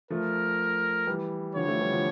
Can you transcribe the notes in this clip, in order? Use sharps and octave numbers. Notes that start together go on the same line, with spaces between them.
F3 A3 A#4
E3 G3
D3 F3 C#5
F3 A3
E3 G3
D3 F3